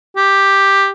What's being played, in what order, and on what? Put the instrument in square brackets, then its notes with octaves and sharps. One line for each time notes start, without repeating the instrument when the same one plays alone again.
[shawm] G4